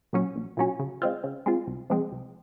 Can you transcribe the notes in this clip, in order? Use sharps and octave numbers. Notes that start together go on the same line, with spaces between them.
A#2 F#3 C#4
A#1
A#2 F#3 C#4
C#3
G#3 C4 F4
C#3
G#3 C4 F4
C2
C3 F3 G#3 C4
C2